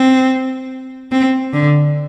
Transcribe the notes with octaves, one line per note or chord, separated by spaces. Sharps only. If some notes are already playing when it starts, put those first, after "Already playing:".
Already playing: C4
C4
D3